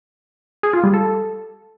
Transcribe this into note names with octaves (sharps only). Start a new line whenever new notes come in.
G#4
F4
G3
A4